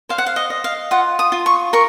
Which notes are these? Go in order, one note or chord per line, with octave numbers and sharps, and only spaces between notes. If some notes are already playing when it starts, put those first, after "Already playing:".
C5 F5
F#5
F5
D#5
D#5
F5
F4 F#5
D#6
F4
C#6
A#4 C#6